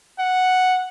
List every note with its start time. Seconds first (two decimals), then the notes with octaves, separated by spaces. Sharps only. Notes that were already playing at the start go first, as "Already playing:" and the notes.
0.19 F#5